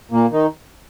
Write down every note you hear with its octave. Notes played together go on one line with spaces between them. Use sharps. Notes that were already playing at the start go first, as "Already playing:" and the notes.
A#2 A#3
D#3 D#4